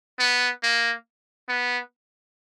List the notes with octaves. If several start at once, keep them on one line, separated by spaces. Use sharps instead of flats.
B3
A#3
B3